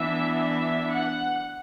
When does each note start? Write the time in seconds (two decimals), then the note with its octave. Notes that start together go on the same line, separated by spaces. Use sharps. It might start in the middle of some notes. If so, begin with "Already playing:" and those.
Already playing: E3 B3 D4 E5
0.39 E5
0.90 F#5